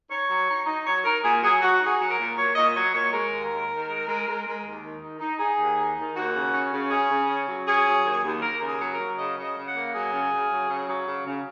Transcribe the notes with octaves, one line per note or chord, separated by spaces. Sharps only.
D#4 C#5
F#3
D#4
D#4
F#3 C#5
D#4 A#4
A#2 G#4
F#3 G#4
F#3 F#4
D#4
G#4
F#3
A#4
A#2
A#2 C#5
A#2 D#5
F#3 C#5
A#2 C#5
G#3 A#4
D#2
D#3
D#3
G#3
G#3
G#3
G#3
D#2
D#3
D#4
D#4
D#4 G#4
D#2
D#4
D#3
D#2 F#4
C#3
C#4
C#3
C#4 G#4
C#3
C#4
F#3
C#4 G#4
F#3
D#2
D#2
D#2 A#4
C#3
G#4
F#3
A#4
F#3
C#3 D#5
C#3
D#5
C#3
F#5
A#3
F#3 G#4
C#3
C#3
F#3
C#3
F#3
C#3
C#3